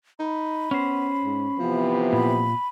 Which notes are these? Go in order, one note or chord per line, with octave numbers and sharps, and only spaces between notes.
D#4 B5
B3 C#4 C5
G#2
C3 E3 F3 B3
A#2 B5